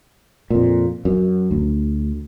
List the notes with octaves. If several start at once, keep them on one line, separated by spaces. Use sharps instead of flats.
F2 A#2
F#2
D2